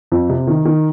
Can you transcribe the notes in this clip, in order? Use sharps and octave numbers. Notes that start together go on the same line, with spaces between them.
F2
C3
D#3
D#3